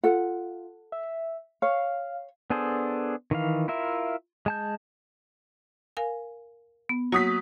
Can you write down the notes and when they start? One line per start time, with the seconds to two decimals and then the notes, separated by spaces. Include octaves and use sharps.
0.04 F4 A4 F#5
0.92 E5
1.62 C#5 F5
2.50 B3 D4 G#4 A4 C5
3.31 D#3 E3 F5
3.68 E4 F4 A#4 E5
4.46 G#3 A5 G6
5.97 A#4 F5 G#5
6.89 B3
7.12 F#3 A#3 F#4 D#6 B6